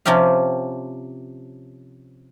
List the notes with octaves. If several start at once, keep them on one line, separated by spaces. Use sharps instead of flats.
C3 F3 C#4 G4 F5